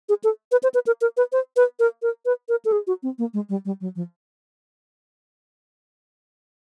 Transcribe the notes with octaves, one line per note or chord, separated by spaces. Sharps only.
G#4
A4
B4
C5
B4
A#4
A#4
B4
C5
B4
A#4
A#4
B4
A#4
A4
G#4
F#4
C4
A#3
G#3
G3
G3
F#3
F3